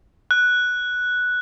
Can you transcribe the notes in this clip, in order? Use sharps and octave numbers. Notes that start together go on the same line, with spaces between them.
F#6